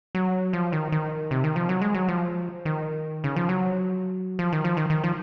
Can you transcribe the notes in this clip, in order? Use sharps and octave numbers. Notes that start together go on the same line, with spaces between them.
F#3
F3
D#3
D#3
C3
D#3
F3
F#3
G#3
F#3
F3
D#3
C#3
F3
F#3
F3
D#3
F3
D#3
D#3
F3